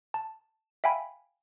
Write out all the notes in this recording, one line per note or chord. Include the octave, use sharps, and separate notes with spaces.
A5
E5 F5 G5 G#5 B5